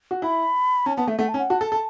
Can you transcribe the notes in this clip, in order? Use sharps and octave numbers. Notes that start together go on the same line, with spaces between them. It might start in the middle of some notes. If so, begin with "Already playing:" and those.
F#4
E4 B5
C#4 A5
B3 A5
A3 E5
A3 F#5
A5
C#4
F#5
F#4 A5
A4
A4